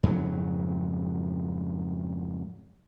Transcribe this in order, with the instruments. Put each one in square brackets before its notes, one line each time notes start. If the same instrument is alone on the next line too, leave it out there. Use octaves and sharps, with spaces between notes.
[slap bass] F2 G#2 C#3 F#3